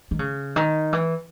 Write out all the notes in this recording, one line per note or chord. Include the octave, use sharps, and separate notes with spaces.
D#3
C#3
D#3
E3